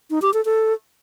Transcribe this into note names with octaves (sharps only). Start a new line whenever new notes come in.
D#4
G4
A4
A4